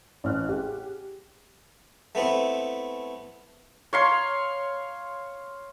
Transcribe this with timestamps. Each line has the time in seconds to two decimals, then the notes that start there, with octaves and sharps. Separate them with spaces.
0.24 A1 F6 F#6
0.49 G4 G#4
2.15 A3 B3 C4 E4
3.93 C#5 F5 C6